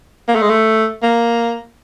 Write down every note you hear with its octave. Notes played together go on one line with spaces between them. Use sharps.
A#3
A3
G#3
A3
A#3